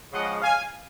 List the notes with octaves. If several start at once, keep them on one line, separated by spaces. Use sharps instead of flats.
C#3 F3 G#3 D#5 F#5
F5 G#5